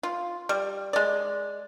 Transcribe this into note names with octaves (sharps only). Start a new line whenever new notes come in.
F4
G3
G#3 D5